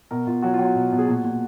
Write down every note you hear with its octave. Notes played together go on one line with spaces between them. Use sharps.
B2 A#4
B2 F4
F#3 F#4
F4
F#3
F#4
B2
B2
G#4
A#2 F#4
A#2